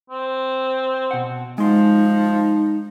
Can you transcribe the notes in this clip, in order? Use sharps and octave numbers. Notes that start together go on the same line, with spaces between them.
C4
B2 F#5
F3 G#3 D#4 C6